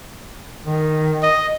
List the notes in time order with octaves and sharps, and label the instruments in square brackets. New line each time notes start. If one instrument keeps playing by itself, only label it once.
[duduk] D#3
[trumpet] D#5